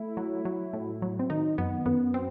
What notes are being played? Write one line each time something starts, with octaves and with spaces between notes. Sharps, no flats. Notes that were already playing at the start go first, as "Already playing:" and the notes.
Already playing: A3 E4
F#3
F#3
A2
F#3
C4
D#3 D#4
F#2 B3
F#2 B3
C4